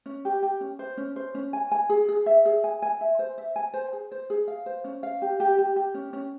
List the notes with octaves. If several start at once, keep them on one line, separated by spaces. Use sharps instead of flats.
C#4
G4
G4
C#4
C5
C#4
C5
C#4
G#5
G#5
G#4
G#4
E5
G#4
G#5
G#5
E5
C5
E5
G#5
C5
G#4
C5
G#4
F5
C5
C#4
F5
G4
G4
G4
G4
C#4
C#4